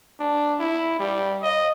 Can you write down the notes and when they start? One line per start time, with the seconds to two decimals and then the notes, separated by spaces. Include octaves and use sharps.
0.20 D4
0.59 E4
0.99 G3
1.43 D#5